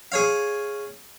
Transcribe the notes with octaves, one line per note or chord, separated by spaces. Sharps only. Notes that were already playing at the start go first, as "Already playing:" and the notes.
G#4 C#5 F5